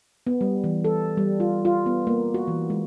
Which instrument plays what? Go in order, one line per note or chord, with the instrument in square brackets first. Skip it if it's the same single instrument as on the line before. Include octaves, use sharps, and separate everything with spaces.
[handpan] B3
G3
E3
A4
G3
F4
F4
B3
A#3
F#4
E3
G#3